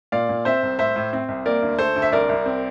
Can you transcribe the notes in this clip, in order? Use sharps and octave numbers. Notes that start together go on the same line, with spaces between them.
A#2 D5 F5
A#2
C4 C5 E5
C2
A2 C5 E5
A2
C4
C2
A#3 A#4 D5
D2
A3 A4 C5
D2
E5
C2 A#4 D5
C2
C4